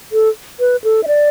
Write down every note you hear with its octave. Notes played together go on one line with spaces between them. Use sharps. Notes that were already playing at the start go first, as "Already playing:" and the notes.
A4
B4
A4
E5
D5